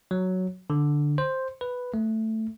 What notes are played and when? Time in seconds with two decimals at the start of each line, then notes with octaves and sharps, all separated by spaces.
0.11 F#3
0.70 D3
1.18 C5
1.61 B4
1.94 A3